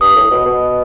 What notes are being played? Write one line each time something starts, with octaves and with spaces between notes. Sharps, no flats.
G2 D#6
A2
B2
B2